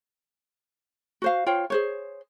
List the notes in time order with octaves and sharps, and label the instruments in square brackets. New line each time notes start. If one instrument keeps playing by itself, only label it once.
[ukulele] F#4 C5 F5
F4 C5 C#5 G5
G#4 C5 C#5